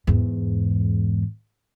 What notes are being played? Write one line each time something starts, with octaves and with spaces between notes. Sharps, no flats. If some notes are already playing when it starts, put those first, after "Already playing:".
E2 G#2